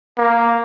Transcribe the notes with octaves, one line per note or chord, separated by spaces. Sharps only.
A#3